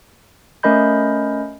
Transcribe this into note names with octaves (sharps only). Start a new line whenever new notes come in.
A3 C#4 A#4 D#5 B5 G6